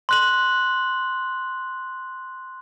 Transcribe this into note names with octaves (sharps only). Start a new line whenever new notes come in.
C6 F#6 F#7